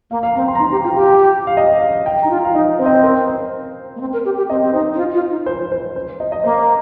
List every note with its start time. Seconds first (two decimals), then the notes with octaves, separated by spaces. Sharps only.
0.11 A#3 F5
0.23 F5
0.35 C4 A#5
0.48 C6
0.55 A#5
0.59 D#4 C6
0.71 G4 A#5
0.84 F4 G5
0.96 G4 F5
1.08 G5
1.47 F5
1.57 D#5
1.81 F5
2.06 G5
2.22 D#4 A#5
2.30 F4
2.45 F4 F5
2.54 D#4 D#5
2.78 C4 C5
2.86 D#5
2.94 C5
3.03 A#4
3.27 C5
3.96 A#3
4.01 C4
4.13 A#4
4.25 G4
4.37 G4
4.50 C4 D#5
4.62 C4
4.73 D#4 C5
4.94 D#4
4.98 F4
5.15 F4
5.30 D#4
5.46 C5
5.72 C5
5.96 C5
6.20 D#5
6.32 D#5
6.44 A#3 C5